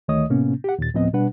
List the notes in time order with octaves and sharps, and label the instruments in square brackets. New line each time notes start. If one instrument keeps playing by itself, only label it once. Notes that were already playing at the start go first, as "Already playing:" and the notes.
[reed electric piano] D2 D#3 A3 C#5 D#5 D#6
A2 C3 A#3 B3 C#4
G4 F#5
D#2 A#2 A6
D2 A2 F3 B3 C4 D#5
B2 G3 D4 B4 F#5